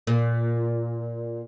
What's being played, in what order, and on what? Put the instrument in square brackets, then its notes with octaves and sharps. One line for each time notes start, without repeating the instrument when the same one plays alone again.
[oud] A#2